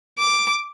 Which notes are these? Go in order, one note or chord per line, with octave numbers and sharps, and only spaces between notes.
D6